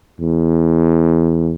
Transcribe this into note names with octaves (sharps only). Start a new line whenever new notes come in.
E2